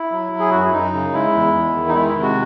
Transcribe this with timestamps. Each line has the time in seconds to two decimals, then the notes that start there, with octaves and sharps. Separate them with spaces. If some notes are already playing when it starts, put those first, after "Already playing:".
Already playing: E4
0.12 F#3
0.33 F#3
0.39 G#4
0.51 F#2 F#4
0.62 E4
0.72 F#2 D#4
0.94 C#3
1.13 G#3 E4
1.34 E2
1.54 E2
1.75 D#3
1.88 D#4
1.94 G#3 E4
2.08 E4
2.15 C3
2.22 F#4